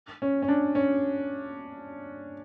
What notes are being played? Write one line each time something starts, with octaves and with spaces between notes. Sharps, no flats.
C#4
C#4
D4
C#4